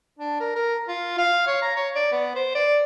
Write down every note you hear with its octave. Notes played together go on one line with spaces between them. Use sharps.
D4
A#4
A#4
F4
F5
C#5
A#5
C#5
D5
B3
C5
D5